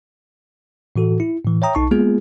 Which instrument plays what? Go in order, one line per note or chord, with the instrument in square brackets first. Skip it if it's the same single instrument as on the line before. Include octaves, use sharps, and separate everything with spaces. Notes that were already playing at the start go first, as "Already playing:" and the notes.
[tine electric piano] A2 E3 F#4 A4
E4
A2 E3
C#5 E5 G5 A#5 D#6
B1 D#4 A5 C#6
G#3 A#3 B3 F4 G#4